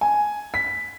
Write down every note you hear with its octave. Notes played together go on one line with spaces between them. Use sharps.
G#5
B6